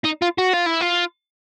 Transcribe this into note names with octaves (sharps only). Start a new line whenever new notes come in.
D#4
F4
F#4
F4
E4
F4